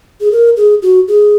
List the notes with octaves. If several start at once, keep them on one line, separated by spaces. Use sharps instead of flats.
G#4
A#4
G#4
F#4
G#4